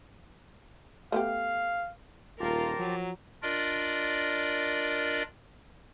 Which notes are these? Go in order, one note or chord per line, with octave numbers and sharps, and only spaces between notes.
A3 B3 G4 F5
D#1 F4 G4 A#4 A5 C6
F3 F#3
D4 F4 A#4 D5 D#5